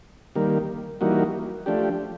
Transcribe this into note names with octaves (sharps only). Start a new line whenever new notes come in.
D#3 G3 A#3
E3 G3 A#3 D#4 F#4
F3 A3 D4 G4